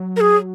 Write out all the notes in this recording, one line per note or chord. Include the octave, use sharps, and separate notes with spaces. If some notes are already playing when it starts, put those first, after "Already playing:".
Already playing: F#3
A#4
G#4